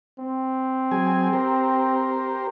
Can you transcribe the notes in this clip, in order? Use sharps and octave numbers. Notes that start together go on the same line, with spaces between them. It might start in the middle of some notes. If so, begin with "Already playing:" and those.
C4
F#3 G#4 G#5
G4 A#4 C5